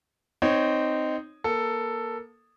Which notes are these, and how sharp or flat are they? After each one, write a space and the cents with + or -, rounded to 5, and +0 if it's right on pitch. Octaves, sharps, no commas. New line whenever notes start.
C4 -15 D#4 -10 C#5 +0
A#3 +20 A4 +5